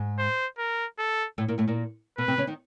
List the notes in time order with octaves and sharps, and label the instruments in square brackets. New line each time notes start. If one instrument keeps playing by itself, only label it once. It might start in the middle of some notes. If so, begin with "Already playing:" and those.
Already playing: [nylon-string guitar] G#2 G#3
[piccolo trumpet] C5
A#4
A4
[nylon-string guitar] A2 A3
A#2 A#3
A2 A3
A#2 A#3
[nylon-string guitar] B2 B3 [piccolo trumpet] B4
[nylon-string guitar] C3 C4
C#3 C#4
D#3 D#4